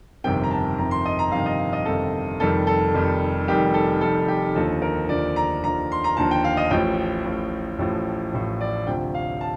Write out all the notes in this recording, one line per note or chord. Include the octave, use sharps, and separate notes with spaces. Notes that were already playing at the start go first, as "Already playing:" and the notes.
G1 F2 C3 D#3 G5
A#5
A5
G1 F2 C3 D#3 A#5
C6
D#5
A#5
G1 F2 C3 D#3 F5
D#5
F5
D#5
G1 F2 C3 D#3 A4
F1 F2 D#3 G3 A4
A4
F1 F2 D#3 G3
F1 F2 D#3 G3 G4
A4
F1 F2 D#3 G3 A4
G4
D#2 D3 F3 A4
A#4
D#2 D3 F3 D5
A#5
D#2 D3 F3 A#5
C6
A#5
D#2 D3 F3 A5
G5
F5
D#5
A1 A2 F3 G5
A1 A2 F3
A1 A2 F3
A1 A2 F3
D5
D2 C3 F3 G5
F5
A5